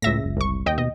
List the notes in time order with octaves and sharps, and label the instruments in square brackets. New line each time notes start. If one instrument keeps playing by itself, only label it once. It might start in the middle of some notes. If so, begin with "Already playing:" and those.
[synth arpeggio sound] C#2 E5 A#6 [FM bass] A2
[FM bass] F#1
[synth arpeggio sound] C2 C#6
D#2 D#5 G5
[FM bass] B2 [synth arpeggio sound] D#5